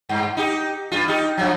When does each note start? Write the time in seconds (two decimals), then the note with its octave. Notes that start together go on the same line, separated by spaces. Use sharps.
0.09 G2
0.37 D#4 G4
0.92 G2 F4
1.08 D#4 G4
1.37 F#2 F3 F#3